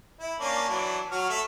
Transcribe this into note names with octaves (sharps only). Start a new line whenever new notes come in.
E4
A#3 C#4 D4
E3 F#3 D4
F#3 F#4 F6
A3 A4 E5